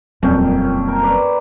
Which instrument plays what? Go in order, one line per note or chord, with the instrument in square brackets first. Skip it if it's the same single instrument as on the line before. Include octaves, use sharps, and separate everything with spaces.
[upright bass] D#1 F#3 [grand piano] F2 [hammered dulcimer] A#2 C#4 G5
[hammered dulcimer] A#4
B4 D5 A#5